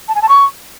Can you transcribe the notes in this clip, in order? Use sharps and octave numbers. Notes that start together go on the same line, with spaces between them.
A5
G#5
A5
C#6